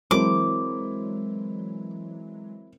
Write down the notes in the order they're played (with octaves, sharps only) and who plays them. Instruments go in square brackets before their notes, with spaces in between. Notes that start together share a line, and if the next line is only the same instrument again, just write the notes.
[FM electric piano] E3 F#3 G#3 [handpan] C4 A#4 C5 [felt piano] E4 [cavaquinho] D6